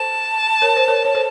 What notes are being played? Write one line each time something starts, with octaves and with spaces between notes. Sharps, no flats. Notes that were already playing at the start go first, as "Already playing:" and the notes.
Already playing: A4 C5 A5
A#4 C#5
C5
A#4 C#5
C#5
A4 C5